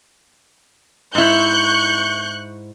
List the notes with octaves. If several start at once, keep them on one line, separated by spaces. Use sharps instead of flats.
G#2 E4 C#6 F#6 G6